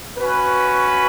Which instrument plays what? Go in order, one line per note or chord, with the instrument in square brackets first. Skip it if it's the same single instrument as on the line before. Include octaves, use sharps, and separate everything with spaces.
[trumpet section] C#4 F#4 B4